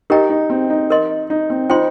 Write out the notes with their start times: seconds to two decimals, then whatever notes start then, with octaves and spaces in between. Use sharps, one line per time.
0.10 D#4 G4 A#4 D#5 G5 A#5
0.30 D#4
0.50 C4
0.70 D#4
0.90 A#4 D#5 C6
1.30 D#4
1.50 C4
1.69 D#4 F4 C5 G5 C6